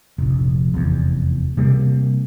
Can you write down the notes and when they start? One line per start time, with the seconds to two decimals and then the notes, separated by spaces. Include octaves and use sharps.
0.18 F1 A#1
0.74 F1 E2
1.57 C3 G3 G#3 A#3